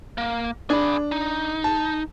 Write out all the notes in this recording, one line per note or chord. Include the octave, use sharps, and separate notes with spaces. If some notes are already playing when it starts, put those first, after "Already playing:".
A#3
D4 G#4 B5
D#4
A5